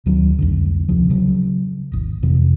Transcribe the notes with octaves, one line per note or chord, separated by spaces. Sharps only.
D2 D#3 F#3
C2 F2 D3
D1 C#2 C3 F3
C#3 F#3
D#1 G#1
F2 C3 E3